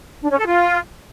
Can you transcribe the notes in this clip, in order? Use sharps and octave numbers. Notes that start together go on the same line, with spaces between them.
D4
C#4
A4
F4